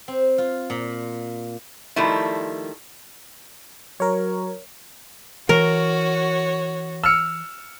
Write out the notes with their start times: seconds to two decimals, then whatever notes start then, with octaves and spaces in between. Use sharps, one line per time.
0.08 C4
0.38 F4
0.70 A#2
1.96 D#3 F3 G3 A3 E4
4.00 F#3 A#4 C#5
5.49 E3 F#4 A#4 C#5
7.04 E6 F6 C#7